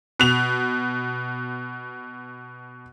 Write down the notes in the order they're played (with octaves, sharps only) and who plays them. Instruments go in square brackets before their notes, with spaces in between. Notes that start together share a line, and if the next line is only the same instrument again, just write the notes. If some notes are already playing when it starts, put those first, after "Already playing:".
[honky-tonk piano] B2 F7